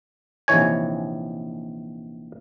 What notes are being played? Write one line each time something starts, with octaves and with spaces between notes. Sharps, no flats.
A#1 C3 D#3 E3 C#5 G#5